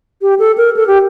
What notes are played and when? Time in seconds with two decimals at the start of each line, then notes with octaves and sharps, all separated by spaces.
0.22 G4
0.39 A4
0.57 A#4
0.76 A4
0.87 G4